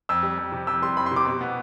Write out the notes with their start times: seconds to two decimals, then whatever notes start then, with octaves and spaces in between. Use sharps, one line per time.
0.09 F2 E6
0.23 G3
0.38 F2
0.52 C3
0.67 F2 E6
0.82 G3 C6
0.97 F2 B5
1.06 C6
1.12 C3 D6
1.26 B2
1.41 B3